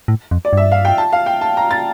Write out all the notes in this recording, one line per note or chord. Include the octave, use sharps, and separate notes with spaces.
A2
F2
D5
G2 E5
F5
G5
A5
F5
G5
A5
A#5
A6